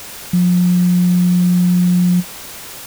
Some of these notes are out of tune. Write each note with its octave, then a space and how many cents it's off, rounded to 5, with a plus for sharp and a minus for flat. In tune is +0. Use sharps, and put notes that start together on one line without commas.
F3 +35